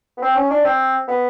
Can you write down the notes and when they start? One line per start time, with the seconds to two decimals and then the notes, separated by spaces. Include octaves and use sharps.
0.17 B3
0.22 C4
0.36 C#4
0.50 D4
0.65 C4
1.08 B3